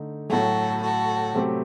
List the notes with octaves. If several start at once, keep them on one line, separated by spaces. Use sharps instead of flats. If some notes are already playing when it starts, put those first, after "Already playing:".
Already playing: D3 A3 D#4
A2 F#3 A3 F#4 A4
F#4 A4
C3 F#3 A3 C4 G4